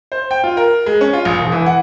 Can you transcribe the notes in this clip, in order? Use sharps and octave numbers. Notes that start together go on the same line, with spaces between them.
C5
G5
F4
A#4
G#3
C#4
F4
A#1
E1
E3
F#5